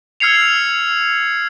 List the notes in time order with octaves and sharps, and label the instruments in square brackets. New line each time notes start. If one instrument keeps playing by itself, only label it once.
[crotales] E6 F6 G#6 C7 C#7 F7